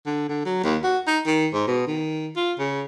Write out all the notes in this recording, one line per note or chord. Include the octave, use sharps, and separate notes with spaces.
D3
D3
F#3
D#2
F#4
D#4
D#3
G#2
B2
D#3
F4
C#3